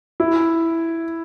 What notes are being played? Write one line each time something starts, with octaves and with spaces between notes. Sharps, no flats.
E4